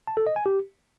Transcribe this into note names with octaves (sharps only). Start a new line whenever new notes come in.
A5
A4
D#5
G#5
G4